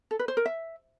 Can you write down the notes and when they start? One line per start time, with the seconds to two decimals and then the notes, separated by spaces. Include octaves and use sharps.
0.11 A4
0.19 B4
0.28 C5
0.37 A#4
0.46 E5